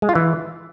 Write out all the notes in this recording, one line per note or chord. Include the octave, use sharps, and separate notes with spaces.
G#3
F4
E3